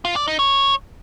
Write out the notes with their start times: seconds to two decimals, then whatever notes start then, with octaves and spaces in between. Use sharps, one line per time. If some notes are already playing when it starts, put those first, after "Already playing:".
0.05 F4
0.16 D5
0.27 D#4
0.39 C#5